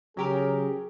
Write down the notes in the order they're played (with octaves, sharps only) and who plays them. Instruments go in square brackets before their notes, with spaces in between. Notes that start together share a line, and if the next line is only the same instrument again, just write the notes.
[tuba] C#3 [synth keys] F#3 G4 A#4 [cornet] G#4